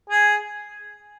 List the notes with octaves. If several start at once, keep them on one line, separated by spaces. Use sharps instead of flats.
G#4